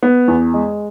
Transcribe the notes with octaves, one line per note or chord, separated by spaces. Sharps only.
B3
E2
G#3